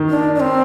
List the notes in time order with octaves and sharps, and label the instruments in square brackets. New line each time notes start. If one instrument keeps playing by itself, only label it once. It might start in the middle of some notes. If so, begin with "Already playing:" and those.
Already playing: [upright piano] D#3
[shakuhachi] D4
D4
C4